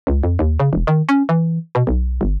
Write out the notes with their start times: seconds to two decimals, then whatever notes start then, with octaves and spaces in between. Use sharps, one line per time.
0.07 C#2
0.24 F2
0.39 D#2
0.60 C#3
0.73 E1
0.87 D#3
1.09 C#4
1.29 E3
1.75 B2
1.87 B1
2.21 G1